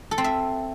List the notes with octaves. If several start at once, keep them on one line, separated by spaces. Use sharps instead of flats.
A4
C4
E5